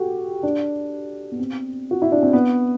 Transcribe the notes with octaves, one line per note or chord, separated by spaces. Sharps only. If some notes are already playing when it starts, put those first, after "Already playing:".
Already playing: F#4 G4 A4
D4
B3
C4
F#4
E4
D4
C4
B3